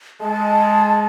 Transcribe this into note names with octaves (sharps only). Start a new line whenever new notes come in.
G#3 A5